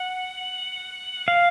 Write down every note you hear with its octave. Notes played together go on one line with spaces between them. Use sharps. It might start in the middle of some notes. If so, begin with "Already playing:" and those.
Already playing: F#5
F5